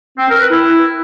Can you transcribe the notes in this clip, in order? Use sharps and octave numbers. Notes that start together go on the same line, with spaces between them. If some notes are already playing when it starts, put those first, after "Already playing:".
C4
A#4
B4
E4